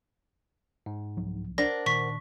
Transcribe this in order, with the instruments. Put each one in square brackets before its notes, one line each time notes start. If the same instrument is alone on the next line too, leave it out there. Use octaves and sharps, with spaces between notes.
[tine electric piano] G#2
[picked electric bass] C2 F3 F#3
[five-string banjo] D4 [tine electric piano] A#4 C5 F#5 [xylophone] A#6
[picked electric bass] A#2 D#3 [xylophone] C#6 B6